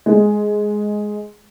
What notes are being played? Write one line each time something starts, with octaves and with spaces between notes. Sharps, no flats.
G#3